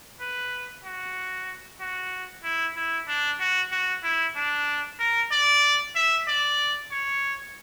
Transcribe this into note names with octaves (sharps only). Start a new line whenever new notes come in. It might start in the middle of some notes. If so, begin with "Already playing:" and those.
B4
F#4
F#4
E4
E4
D4
F#4
F#4
E4
D4
A#4
D5
E5
D5
C#5